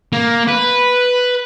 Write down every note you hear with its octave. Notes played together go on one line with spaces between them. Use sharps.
A#3
B4